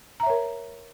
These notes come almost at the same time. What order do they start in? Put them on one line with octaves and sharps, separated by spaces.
A#5 E5 C#5 A#4